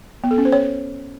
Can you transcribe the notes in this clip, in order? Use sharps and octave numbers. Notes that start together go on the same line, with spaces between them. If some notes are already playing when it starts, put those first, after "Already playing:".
B3
A4
C#4
C5
C#5